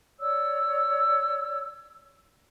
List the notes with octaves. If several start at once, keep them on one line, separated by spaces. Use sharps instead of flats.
C#5 D5 E6